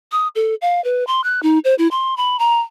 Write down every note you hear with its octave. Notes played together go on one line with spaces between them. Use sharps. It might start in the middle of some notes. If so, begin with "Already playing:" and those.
D#6
A4
F5
B4
C6
F#6
D#4
C5
E4
C6
B5
A#5